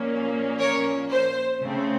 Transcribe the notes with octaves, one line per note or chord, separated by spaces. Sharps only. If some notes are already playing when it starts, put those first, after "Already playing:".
Already playing: A#2 F3 A#3 C#4
A#4 C#5
C5
C#3 A3 C4